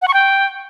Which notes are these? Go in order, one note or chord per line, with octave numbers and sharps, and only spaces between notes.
F#5
C#6
G5